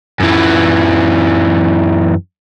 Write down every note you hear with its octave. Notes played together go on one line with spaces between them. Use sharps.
F#2 E3